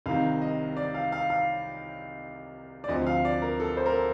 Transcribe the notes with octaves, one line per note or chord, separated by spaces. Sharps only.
C2 C3 D#3 F5
D#5
D5
F5
F5
F5
D5
D2 C3 F3 D#5
F5
D5
A#4
A4
C5
A#4
A4